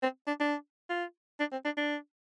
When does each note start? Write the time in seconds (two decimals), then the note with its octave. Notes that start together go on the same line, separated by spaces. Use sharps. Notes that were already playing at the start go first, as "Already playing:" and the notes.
0.03 C4
0.27 D4
0.40 D4
0.90 F4
1.40 D4
1.52 C4
1.65 D4
1.77 D4